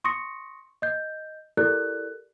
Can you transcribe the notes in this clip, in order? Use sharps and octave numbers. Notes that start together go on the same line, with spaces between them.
C6 C#6 D#6 A#6 C#7
D#5 G6
E4 G4 A4 A#4 D5 F#6